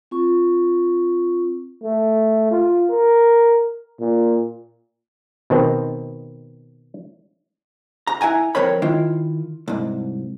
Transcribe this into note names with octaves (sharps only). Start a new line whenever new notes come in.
C4 F4 C#6
A3
F4
A#4
A#2
B2 D#3 C4
A#5
E4 F#5 G#5 A#5
F2 C4 A#4 C#5 B5
D#3 E4 F4
C2 G#2